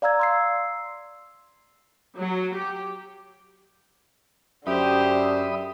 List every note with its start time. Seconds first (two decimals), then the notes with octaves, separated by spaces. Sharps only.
0.02 D5 F5 A#5 E6 G#6
0.19 C6 E6 C7
2.19 F#3
2.56 G4
4.67 F#2 D3 G4 C5 E5 B5 D#6